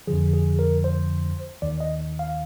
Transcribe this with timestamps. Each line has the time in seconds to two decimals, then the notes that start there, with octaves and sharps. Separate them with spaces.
0.07 F2 D3 F3 G#4
0.33 G#4
0.59 A#4
0.84 C5
1.62 D#2 D#3 D5
1.80 D#5
2.19 F5